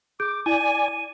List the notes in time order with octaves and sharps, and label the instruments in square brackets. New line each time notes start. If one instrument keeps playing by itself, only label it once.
[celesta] G#4 G6 D7 [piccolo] D6
[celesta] E4 [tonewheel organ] D5 G#5 [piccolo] D#7